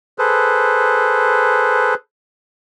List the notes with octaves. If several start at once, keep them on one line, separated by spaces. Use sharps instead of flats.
G#4 A4 B4 C5